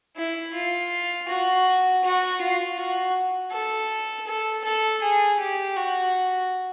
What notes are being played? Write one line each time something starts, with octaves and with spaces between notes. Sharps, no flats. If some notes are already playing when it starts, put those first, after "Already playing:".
E4
F4
F#4
F#4
F4
F#4
A4
A4
A4
G#4
G4
F#4